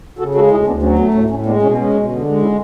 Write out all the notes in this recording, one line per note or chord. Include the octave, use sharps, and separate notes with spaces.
C#3 F#4 A4
G#3 F#4 A4
D2 E4 G#4
D2 B3 D4
F#3 C#4
A3 B3
A2 C#4
A2 C#4
G#3 B3 D4
B2 C#4
G#3 C#4
B2
D3
G#3
C#4 E4